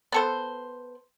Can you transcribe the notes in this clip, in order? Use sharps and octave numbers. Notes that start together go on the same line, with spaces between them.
B3 A4 C5